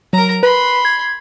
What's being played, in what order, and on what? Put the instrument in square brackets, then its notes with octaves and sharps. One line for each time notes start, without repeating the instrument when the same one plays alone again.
[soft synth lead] F#3 [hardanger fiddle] A#4 A#5
[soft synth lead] B4 [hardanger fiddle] B5 C6
[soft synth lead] G#6